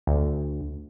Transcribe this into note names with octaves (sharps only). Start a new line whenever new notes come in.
D2